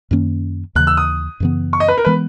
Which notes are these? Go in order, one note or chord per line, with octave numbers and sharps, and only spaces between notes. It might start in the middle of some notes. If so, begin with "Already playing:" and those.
F#2 D#3 A#3 C#4
D#2 C#3 E3 F#6
E6
D#6
F#2 C#3 E3 B3
C#6
D#5
B4
A#4
E3 G#3 B3 B4